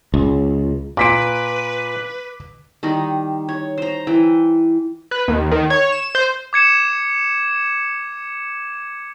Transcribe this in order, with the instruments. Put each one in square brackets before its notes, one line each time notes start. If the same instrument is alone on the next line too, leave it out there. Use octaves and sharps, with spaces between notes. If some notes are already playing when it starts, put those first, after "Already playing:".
[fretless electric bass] C#2
[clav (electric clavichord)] A#2 [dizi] B4 [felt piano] D6 B6 D7
[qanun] D#3 G3 D#4
C#5
C5 A#5
E3 G5
[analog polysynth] B4
D#2
D#3
C#5
E7
C5
[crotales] D6 G#6 C#7 E7